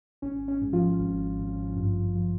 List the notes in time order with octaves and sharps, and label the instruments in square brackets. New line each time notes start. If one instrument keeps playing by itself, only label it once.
[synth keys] G#1 C#4
C#4
G#2
F3 F4
G#1
G#1
G2
F3